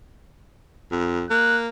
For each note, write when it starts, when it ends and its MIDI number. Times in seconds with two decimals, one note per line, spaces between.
0.91 1.24 41
1.30 1.68 58
1.30 1.57 90